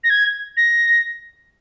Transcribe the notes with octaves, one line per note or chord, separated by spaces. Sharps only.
A#6
G#6
A#6